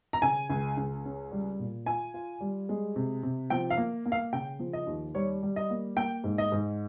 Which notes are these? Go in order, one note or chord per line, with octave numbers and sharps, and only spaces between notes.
A#5
C#3 G#5
C#2
C#2
C#4
G3
A#2
F4 G#5
F4
G3
G#3
C3
C3
F3 G5
F5
A#3
A#3
F5
C#3 G5
F3
D#5
D#2
G3 C#5
G3
D#5
A#3
A#3 G5
G#2
D#5
G#2